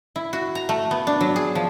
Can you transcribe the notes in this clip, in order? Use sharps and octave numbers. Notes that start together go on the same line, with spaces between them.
E4
F#4
A#5
A3
B3
D4
F#3
G#4
F3